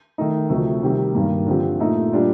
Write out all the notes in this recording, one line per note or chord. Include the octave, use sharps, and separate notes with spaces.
D#3 A3 D#4
D2 C3 F3 A3
C3 D#3 G3 C4 G4
G2 D#3 A#3
D3 F3 C4 G4
A#2 A3 D#4
A#2 G3 D4 F4